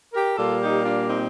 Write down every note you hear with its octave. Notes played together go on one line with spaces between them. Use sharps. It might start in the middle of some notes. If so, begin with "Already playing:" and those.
G4 A#4
A#2 G3 A#3 F4 A4
D#4 G4
D4 F4
C4 D#4